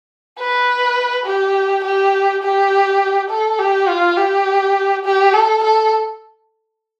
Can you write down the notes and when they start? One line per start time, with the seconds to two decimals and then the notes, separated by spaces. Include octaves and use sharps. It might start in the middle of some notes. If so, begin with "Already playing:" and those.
0.39 B4
1.26 G4
1.84 G4
2.43 G4
3.30 A4
3.59 G4
3.88 F4
4.18 G4
5.05 G4
5.33 A4
5.64 A4